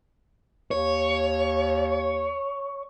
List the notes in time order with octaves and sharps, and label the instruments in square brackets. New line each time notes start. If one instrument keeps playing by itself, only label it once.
[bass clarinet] D#2 [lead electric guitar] C#5